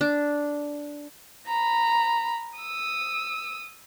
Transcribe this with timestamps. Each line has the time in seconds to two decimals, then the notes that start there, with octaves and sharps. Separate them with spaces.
0.01 D4
1.47 A#5 B5
2.59 D#6 E6